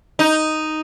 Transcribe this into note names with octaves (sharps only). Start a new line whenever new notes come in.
D#4